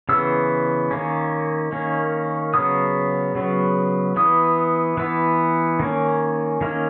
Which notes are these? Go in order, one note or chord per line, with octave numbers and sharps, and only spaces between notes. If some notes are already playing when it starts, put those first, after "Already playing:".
C#3 E3 B3 E6
D#3 A#3 C#4
D#3 A#3 C#4
C#3 F#3 B3 D#6
C#3 F#3 B3
E3 B3 D#6
E3 B3
D#3 A#3 C#4
D#3 A#3 C#4